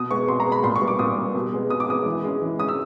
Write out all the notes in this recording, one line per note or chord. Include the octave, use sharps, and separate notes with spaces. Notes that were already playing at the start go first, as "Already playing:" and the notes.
Already playing: B2 D#6
G#3 B3 C#6
B2 C6
A#5
G#3 B3
B5
A#2 C6
C#6
G3 B3
D6
A#2 D#6
G3 B3
B2
G#3 B3
B2 D#6
D6
G#3 B3 D#6
E3
G#3 C#4
E3
G#3 C#4 D#6
E6